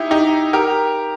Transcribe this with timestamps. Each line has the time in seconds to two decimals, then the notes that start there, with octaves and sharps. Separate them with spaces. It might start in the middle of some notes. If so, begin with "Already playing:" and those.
Already playing: D#4 E4 G4
0.11 D#4 G4
0.53 G4 A#4